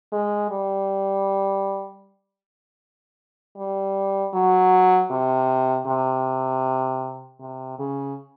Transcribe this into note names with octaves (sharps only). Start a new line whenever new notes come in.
G#3
G3
G3
F#3
C3
C3
C3
C#3